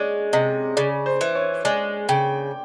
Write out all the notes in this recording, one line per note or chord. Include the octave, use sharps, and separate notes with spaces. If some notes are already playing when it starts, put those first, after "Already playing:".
Already playing: G#3 C#5 D5
C3 D#5
C#3 D5
C5
E3
C#5
G#3 D5
C#3 G5